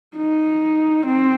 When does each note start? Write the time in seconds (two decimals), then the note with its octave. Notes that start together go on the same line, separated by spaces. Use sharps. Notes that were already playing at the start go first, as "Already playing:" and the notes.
0.17 D#4
1.06 C4